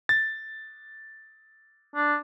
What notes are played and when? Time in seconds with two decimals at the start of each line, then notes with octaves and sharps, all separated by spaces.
0.09 A6
1.95 D4